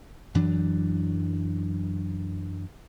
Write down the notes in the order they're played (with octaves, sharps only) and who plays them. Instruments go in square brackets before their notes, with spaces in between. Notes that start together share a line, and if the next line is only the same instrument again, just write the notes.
[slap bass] F#2 E3 F#3 D4